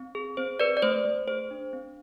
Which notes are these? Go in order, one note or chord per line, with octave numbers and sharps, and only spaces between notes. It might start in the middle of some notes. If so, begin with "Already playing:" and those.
Already playing: C4
G#4
C4 C5
G#4 B4 D5
D5
A3 C5
A3
G#4 C5
D4
C4